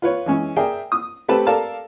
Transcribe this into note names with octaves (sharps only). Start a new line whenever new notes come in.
F4 B4 C#5
E3 G#3 C#4
G#4 A#4 D5 E5 G5
D#6
A3 C4 G4 A4 B4 A5
A4 A#4 D5 F5 A5